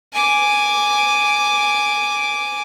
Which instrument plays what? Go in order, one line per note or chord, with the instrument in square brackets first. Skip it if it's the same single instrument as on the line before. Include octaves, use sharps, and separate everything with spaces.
[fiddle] G#5 D6